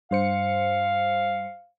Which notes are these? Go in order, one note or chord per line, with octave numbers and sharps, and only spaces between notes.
G2 C5 F5 C#7